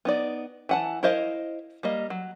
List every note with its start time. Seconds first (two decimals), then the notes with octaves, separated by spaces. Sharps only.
0.05 B3 D#4 D5
0.69 E3 F#5 A5
1.03 E4 A#4 C5 D#5 F5
1.83 G3 A#3 D#5
2.10 F#3